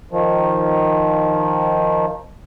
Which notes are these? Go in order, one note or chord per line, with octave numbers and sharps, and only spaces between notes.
D#3 F3